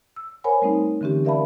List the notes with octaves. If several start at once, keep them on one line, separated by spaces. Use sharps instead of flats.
E6
A#4 C5 C#5 F#5 G#5 B5
G3 A3 C4 D#4
D3 E3 C4 C#4 G4
A#4 D5 E5 F5 A5 B5